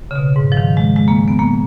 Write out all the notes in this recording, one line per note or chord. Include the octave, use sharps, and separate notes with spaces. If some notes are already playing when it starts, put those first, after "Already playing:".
C#3
B2
G#2
F3
D#3
G#3
G#3
A#3
B3
A#3